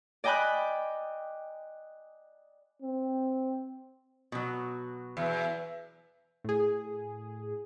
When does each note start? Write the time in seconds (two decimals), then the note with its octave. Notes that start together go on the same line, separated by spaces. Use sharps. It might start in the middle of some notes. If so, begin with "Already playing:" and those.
0.24 D5 D#5 G5 G#5 B5 F#6
2.82 C4
4.32 B2 F#3
5.17 E2
6.44 A2 G#4